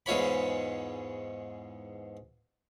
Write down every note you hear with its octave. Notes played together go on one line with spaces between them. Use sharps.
E2 G#2 F4 C#5 B5